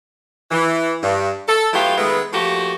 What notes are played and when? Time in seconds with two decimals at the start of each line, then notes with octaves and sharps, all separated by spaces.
0.51 E3
1.03 G2
1.48 A4
1.73 F#3 A3 B3 E4 F4 G4
1.97 D#3 G#3 A3 B3
2.33 F3 A3 A#3 F#4 G4